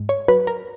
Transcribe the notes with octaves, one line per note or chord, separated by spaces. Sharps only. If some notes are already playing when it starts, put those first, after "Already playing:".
Already playing: G#2
C#5
F#3 B4
A#4